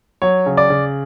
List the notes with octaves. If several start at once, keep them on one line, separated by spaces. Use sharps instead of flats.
F#3 C#5
C#3
D5
C#3